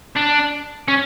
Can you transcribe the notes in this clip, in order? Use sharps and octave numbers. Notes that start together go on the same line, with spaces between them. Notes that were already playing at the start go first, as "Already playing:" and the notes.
D4
C#4